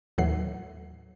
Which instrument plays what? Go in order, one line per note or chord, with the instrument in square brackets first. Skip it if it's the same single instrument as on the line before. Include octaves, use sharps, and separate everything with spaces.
[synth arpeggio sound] D#2 A2 E3 F#3 F#5 C7